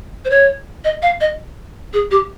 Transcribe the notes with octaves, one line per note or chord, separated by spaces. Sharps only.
C5
C#5
D#5
F5
D#5
G#4
G4